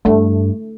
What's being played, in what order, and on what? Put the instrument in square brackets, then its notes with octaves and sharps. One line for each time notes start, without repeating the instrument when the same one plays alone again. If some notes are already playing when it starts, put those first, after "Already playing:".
[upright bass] G2 [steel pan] A3